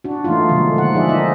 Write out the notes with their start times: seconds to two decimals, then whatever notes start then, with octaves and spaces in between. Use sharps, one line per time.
0.04 D4 F#4
0.24 E3 A3 A#3 D#4 F4
0.49 B2 D3 D#3 F3 G#3 A#3
0.74 D3 D#3 F#5
0.94 F3 D#4 G#4 D5 E5
1.09 D#4 E4 D#5 E5